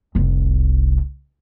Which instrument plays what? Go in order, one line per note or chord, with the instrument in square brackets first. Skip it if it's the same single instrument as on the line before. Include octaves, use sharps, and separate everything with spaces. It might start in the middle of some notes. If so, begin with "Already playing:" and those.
[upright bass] F1 C2